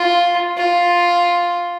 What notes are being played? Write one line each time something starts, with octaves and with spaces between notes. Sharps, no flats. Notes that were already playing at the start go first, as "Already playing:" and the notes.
Already playing: F4
F4